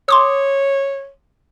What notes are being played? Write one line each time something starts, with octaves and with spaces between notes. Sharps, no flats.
C#5 C6 D6 D#6